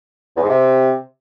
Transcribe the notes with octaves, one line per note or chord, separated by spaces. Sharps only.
E2
G#2
C3